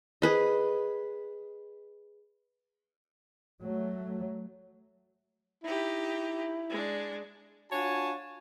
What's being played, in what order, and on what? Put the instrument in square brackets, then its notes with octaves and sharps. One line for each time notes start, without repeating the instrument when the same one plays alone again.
[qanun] G#4 B4 D#5
[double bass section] F#3 A3
[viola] D#4 G4 [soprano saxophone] E4
[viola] G#3 D4
[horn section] D4 F4 F#4 C#5 G#5 A5